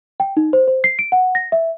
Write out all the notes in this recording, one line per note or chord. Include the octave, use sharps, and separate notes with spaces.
G5
D#4
C5
C5
C7
D7
F#5
A#6
E5